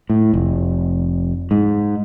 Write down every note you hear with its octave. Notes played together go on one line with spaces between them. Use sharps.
A2
F1
G#2